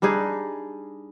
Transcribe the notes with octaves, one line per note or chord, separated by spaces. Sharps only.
G3 D4 D#4 G#4